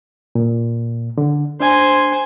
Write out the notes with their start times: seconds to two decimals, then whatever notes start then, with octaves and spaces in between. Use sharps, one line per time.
0.35 A#2
1.18 D3
1.60 D4 C5 G#5